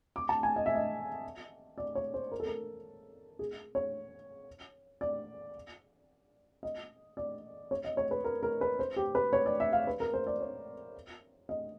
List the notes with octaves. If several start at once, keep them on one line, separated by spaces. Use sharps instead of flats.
D6
A5
G#5
D#5
E5
D#5
D5
C#5
C5
A#4
A4
A#4
G#4
C#5
D5
D#5
D5
C#5
D#5
C#5
B4
A#4
A#4
B4
C5
G4
B4
C#5
D5
E5
F5
B4
A#4
C5
D5
C#5
D#5